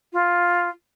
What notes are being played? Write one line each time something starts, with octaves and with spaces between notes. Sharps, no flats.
F4